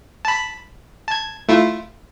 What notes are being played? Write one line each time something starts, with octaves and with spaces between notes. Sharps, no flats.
A5 B5
A5 G#6
A3 E4 F4